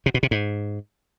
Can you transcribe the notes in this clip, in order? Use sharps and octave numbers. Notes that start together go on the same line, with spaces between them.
C3
B2
C3
G#2